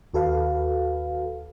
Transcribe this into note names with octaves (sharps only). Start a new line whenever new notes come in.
D#2 F#4 A4 B4 F5